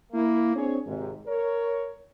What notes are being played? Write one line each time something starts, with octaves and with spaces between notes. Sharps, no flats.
A#3 E4
C4 D4 G#4 C#5
G#1 G#2 C3
A#4 C#5